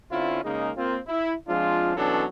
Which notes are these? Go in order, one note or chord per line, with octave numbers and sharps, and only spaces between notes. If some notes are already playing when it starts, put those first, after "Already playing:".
D3 C4 C#4 E4 F4
C#3 G#3 A#3 D#4
A#3 C4 F4
E4
F3 G#3 C4 D4 F4
B2 E3 F#3 C#4 D4 A4